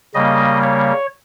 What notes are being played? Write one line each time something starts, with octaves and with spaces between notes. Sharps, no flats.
C#3 G3 A#3 D#5
C#5